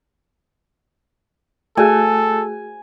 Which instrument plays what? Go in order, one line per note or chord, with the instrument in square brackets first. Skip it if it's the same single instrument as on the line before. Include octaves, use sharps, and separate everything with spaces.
[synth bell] A3 F#4 G#4 [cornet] A4 [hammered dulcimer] G#5